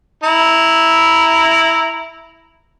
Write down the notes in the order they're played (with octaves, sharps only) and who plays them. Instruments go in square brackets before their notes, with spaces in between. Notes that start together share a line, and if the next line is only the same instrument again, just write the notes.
[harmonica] E4 A#5